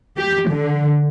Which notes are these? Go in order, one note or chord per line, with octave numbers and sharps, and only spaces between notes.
G4
D3